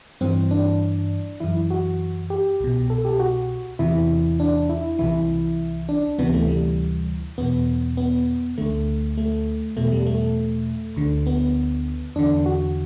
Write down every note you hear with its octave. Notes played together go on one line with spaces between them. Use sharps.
G2 E3 C4
D4
F#2 E3 E4
F#4
G4
C2 B2
A4
G4
F#4
E2 C3 E3 E4
D4
E4
C2 C3 E3 E4
D4
D2 C3 E3 B3
A3
G3
E2 B2 B3
B3
D2 D3 A3
A3
E2 B2 A3
G3
A3
D2 D3
B3
E2 D3 D4
F#4